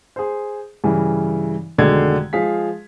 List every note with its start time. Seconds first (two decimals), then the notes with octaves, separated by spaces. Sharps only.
0.16 G#4 C5
0.84 G2 C#3 E3
1.78 F1 B2 D3 D#3 G#3 G#6
2.33 F3 G#3 G#4 F5 B6